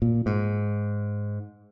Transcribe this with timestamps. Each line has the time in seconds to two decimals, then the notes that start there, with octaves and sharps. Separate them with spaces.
0.02 A#2
0.26 G#2